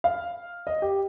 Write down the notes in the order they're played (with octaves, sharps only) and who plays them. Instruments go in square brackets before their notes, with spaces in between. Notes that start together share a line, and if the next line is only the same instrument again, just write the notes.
[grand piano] F5
D#5
G4